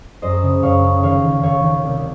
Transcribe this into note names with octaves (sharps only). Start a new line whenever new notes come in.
F#2 C5 D#5
C#3
F#2 C#5 F5
C#3
D#2 C#5 F5
D#3
D#2 C#5 F5
D#3
C2